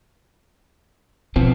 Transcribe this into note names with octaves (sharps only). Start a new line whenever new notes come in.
B2 F3 B3 C4